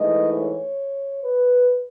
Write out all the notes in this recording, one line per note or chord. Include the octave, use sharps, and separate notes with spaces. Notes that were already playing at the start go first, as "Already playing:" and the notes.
Already playing: G#2 E3 A3 D#5
C#5
B4